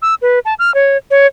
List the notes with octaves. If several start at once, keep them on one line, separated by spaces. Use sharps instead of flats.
E6
B4
A5
F6
C#5
C#5